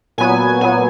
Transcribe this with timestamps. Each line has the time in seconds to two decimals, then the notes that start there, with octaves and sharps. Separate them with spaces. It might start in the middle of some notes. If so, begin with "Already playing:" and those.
0.18 A#2 F#3 B3 G#5
0.61 A#2 F#3 B3 G#5